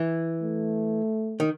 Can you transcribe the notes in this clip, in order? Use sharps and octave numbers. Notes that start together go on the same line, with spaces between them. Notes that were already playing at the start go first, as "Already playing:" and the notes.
Already playing: E3
A3
D#3